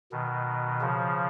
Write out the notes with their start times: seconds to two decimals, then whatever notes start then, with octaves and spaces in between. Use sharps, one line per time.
0.12 B2 D#3
0.81 C#3 F3